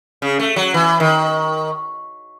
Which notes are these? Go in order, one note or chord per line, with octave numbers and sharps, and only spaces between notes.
C#3
A3
F#3
E3
D#3